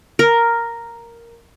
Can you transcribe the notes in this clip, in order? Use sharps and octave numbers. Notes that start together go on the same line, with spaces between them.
A#4